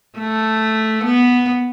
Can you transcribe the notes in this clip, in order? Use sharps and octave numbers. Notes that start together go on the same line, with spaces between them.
A3
B3